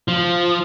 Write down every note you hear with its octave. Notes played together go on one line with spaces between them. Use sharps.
F3